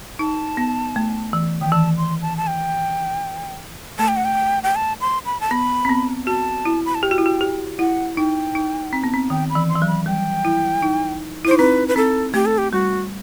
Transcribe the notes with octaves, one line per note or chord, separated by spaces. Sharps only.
D#4 A5
B3
A3
E3
D#3 G5
E3 A5
C6
A5
A5
G5
A3 A5
G5
F#5
G5
G5
A5
C6
B5
A5
B3 B5
C4
B3
F#4 A5
E4
B5
A5
G4 G5
F#4
E4
F#4
G4
E4 F#5
D#4 G5
D#4
C4
B3
C4
D#3 G5
B5
E3
C6
E3
F#3
B5
G3 G5
E4
D#4
E4
D#4 C5
C4 B4
B4
C4 A4
A3 G4
A4
G4
G3 F#4